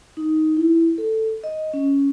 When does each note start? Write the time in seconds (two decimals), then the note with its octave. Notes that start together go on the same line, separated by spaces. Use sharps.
0.17 D#4
0.57 E4
0.98 A4
1.44 D#5
1.74 C#4